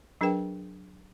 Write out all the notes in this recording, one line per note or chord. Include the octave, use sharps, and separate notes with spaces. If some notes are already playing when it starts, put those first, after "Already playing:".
F#3 D4 G#4 A#4 B4 G5